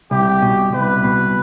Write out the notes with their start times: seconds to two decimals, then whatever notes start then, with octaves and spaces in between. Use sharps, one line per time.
0.11 C2 G4
0.42 B2
0.73 C2 B4
1.04 B2